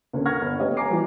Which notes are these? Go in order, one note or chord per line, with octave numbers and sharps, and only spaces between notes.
D2 A#3 C#4
A#4 F#5 C#6 F6 G#6 A#6
G1 B4
A3 B3 G4 C#5 D#5
G#5 A#5 D6 C7
E3 F3 G3 F#4